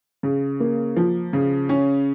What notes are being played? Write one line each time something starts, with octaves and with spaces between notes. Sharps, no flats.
C#3
A#3
F3
C#3
C#4